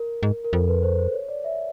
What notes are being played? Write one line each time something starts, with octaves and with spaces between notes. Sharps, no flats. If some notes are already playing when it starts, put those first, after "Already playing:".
Already playing: A#4
G#2
A#4
F2 A4
B4
C5
C5
C#5
D5
E5